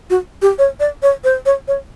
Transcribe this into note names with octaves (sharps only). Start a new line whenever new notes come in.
F#4
G4
C#5
D5
C#5
C5
C#5
C#5